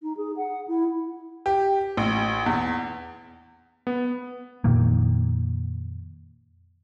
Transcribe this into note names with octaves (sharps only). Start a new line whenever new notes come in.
D#4
G#4
F#5
E4
G4
A1
E2
B3
F2 A#2 D#3 A#3